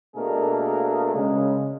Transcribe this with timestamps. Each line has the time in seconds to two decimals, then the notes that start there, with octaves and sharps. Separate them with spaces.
0.15 B2 A3 A#3 D4 G#4 A#4
1.14 C#3 G#3